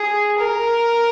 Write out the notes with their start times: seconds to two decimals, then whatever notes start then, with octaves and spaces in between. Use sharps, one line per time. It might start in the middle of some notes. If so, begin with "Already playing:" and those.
Already playing: G#4
0.39 A#4